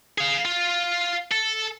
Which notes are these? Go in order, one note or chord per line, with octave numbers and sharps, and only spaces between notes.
G#4 F5
F4
A4